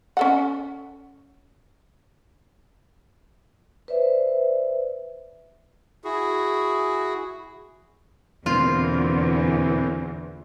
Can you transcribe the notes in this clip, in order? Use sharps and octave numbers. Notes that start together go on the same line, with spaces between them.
C#4 A4 F#5
B4 C5 D5 E5
E4 F#4 G#4
E2 B2 D3 E3 A#3 C4 F4